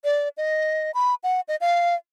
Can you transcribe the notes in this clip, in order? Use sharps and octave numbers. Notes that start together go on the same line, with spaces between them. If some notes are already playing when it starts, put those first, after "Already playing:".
D5
D#5
B5
F#5
D#5
F5